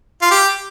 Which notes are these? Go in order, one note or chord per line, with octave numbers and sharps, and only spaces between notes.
F4
G4